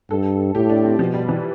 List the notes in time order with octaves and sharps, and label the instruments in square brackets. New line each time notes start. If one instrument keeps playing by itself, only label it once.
[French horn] G2 [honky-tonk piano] A4
[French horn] A2 [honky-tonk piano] G4
[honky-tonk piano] D4
C4
[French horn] B2 [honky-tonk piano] F3
[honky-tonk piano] G3
E3